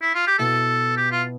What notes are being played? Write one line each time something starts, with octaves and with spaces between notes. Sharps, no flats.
E4
F4
G4
B2 B3 E4 A4
G4
F4